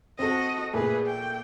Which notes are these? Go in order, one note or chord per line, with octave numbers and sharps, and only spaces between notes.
C4 F#4 A4 D#5
A#2 A3 G#4 B4
G5